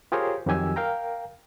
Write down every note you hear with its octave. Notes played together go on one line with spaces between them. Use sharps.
F4 G4 G#4 A#4 C5 C#5
F2 D#3 F#3 G4 G#5 E6
A#4 F5 G5 A#5